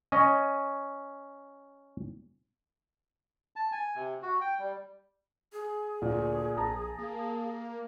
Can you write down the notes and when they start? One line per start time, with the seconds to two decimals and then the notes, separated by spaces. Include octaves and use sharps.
0.12 C#4 D#5
3.56 A5
3.72 G#5
3.96 C3
4.22 F#4
4.41 G5
4.59 G3
5.53 G#4
6.02 D2 A#2
6.57 A#1 A5 A#5
6.98 A#3